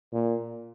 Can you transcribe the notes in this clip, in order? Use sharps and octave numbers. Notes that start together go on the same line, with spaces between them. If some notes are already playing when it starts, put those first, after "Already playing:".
A#2